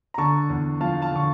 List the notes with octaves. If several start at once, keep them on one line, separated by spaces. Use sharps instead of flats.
A#5
D3 A5 C#6
E2
F3 F5 A5
F5 A5
D3 C#6